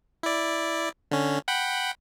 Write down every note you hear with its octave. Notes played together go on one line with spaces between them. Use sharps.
E4 D5
D3 C#4
F#5 G5 B5